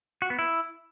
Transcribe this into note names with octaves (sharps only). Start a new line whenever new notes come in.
F#4
B3
E4